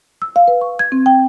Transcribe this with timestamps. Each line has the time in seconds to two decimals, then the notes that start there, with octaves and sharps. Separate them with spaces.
0.22 E6
0.36 F5
0.48 B4
0.61 C#6
0.79 G#6
0.92 C4
1.06 G5